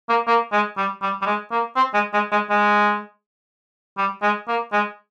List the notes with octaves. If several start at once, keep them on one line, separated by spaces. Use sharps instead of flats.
A#3
A#3
G#3
G3
G3
G3
G#3
A#3
C4
G#3
G#3
G#3
G#3
G3
G#3
A#3
G#3